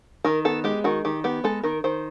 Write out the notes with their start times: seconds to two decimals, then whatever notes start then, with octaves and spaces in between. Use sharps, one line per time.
0.25 D#3 A#4
0.45 B3 A4
0.64 G#3 G4
0.84 D#3 F#4
1.05 D#3 G4
1.24 B3 G4
1.44 G#3 A4
1.63 D#3 A#4
1.84 D#3 C5